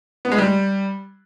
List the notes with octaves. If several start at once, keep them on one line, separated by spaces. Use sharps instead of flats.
B3
G#3
G3